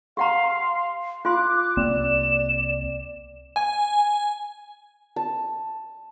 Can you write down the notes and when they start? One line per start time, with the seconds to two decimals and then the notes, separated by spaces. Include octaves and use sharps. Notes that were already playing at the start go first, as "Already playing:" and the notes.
0.17 G4 F5 F#5 A#5 C6
1.25 F4 F5 C6 D6 F#6
1.77 C2 A#3 C4 D5 E7
3.56 G#5
5.16 A5